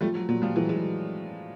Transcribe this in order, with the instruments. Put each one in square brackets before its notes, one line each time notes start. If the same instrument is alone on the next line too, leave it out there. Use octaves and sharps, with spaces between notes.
[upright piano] F3 [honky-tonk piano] G3 A3
[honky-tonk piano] F#3
[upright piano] A#2 [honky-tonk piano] F#3
[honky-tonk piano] F3 G3
[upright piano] E3 [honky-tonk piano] F#3 G#3
[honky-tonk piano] F#3 G#3